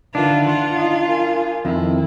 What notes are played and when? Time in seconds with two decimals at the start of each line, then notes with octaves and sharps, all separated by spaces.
0.15 D3 D#3 D4 F4 B4 E5
0.47 F4 F#5 C6
0.77 D#4
1.06 A#3 G#5
1.65 F2 D#3 E4